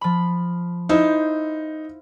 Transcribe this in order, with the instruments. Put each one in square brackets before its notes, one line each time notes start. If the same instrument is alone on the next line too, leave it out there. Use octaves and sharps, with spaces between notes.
[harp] F3 B5
[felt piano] D#4 [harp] E4 C5 F5